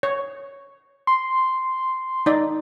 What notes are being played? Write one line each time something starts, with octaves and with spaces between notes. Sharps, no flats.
C#5
C6
D#4 D5